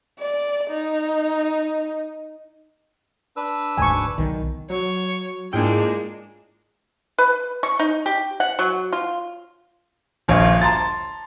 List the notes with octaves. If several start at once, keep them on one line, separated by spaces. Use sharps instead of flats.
D5
D#4
D4 B4 E6
F1 D2 G#2 G#5 C#6
B1 D#3
F#3 C#5
G#2 G#3 A#3 D4 E4 F4 G#4 G5
B4
C#6
D#4
G4
F#5
F#3
F4
D#1 A#1 C#5 F5
A5 A#5 C6 A6